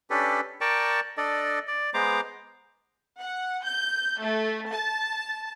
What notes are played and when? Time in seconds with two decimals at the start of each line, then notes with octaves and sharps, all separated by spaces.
0.10 C#4 D4 G4 A4 B4
0.61 A#4 D5 G5 A5 C#6
1.17 D4 A4 D5 D#5
1.67 D5
1.94 G#3 B3 C5 A#5 D6
3.17 F#5
3.61 G6
4.19 A3
4.69 A5